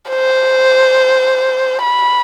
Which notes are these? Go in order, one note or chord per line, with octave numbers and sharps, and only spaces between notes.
C5
B5